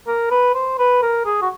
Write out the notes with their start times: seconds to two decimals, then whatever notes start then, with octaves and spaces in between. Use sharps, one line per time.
0.07 A#4
0.30 B4
0.54 C5
0.79 B4
1.02 A#4
1.25 G#4
1.42 F#4